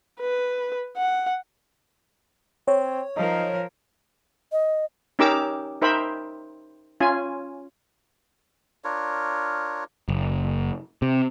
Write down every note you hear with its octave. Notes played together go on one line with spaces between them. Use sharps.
B4
F#5
C4 C#5
F3 D#4 A#4
D#5
C#4 D#4 G4 A#4 D6 E6
D#4 A#4 C5 E5 G5 B5
C#4 F4 G#5
D4 F4 A#4 C#5
F#1
C3